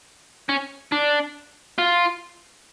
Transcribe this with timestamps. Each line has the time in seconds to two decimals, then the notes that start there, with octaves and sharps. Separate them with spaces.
0.49 C#4
0.92 D4
1.78 F4